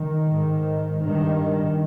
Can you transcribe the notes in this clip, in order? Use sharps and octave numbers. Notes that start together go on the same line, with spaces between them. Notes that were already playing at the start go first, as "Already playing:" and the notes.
Already playing: D#3
G#2
G2 D#3